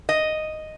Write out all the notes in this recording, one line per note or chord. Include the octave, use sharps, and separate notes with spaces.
D#5